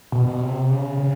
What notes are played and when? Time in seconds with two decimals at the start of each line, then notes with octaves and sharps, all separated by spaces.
0.12 B2
0.28 B2
0.41 C3
0.70 C#3
0.97 C#3